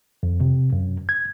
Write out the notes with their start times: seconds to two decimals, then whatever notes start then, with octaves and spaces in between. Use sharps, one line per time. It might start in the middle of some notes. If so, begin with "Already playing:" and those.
0.23 F2
0.41 C3
0.73 F#2
1.09 G#6